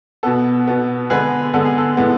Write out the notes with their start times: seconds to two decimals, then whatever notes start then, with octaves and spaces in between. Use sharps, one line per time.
0.23 B2 B3 A4
0.67 B2 B3
1.10 D3 G#3 B3 G#4 B4
1.54 D3 G#3 B3 A4
1.65 G#4
1.78 A4
1.97 A2 G#3 B3